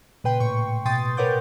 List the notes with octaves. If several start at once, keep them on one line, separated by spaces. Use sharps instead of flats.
A#2 C#3 B4 G5 C6
A2 G5 C#6
B2 G5 C6 D#6 A6
A#4 B4 C#5 F#5 D6 G6